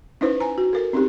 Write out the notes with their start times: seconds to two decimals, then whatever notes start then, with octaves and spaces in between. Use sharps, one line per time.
0.21 C#4 D#4 E4 B4 C5
0.40 G#5 A#5
0.58 F#4
0.73 A4 A#4
0.93 C4 C#4 D#4 G4